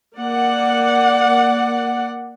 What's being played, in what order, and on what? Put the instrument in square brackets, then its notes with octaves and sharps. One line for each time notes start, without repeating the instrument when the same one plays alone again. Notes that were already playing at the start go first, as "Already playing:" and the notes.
[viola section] A#3 D5 F#5